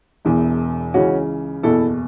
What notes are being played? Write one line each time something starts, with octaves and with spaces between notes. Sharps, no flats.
E1 E2 E3
C#2 C#3 E3 C#4 F#4
F#1 E2 B2 E4 A4